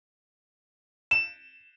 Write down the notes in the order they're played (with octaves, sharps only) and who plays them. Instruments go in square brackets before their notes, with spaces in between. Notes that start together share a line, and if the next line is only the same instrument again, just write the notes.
[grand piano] E7